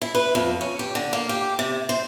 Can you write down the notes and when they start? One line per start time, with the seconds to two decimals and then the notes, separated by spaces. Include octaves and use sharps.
0.02 E4
0.15 B4
0.35 F2
0.61 C#4
0.79 G4
0.95 D3
1.13 A#3
1.29 G4
1.59 C3
1.89 C5